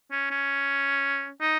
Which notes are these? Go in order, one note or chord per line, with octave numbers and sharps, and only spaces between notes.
C#4
C#4
D#4